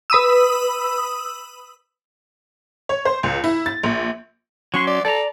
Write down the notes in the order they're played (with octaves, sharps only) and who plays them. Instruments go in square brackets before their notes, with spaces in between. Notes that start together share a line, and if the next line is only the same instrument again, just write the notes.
[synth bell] B4 B5 D#6 E6
[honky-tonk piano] C#5
C5
C#2
E4
A6
A#1
[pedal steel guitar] F#3 C#4 C6 [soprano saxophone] C#6
[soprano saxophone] D5
[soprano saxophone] A4 [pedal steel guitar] D5 A#5